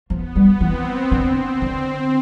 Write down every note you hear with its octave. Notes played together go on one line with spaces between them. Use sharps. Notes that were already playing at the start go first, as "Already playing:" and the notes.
F3 B3
G3
E3 C4
D3 C4
D3